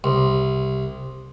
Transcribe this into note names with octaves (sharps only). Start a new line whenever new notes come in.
C2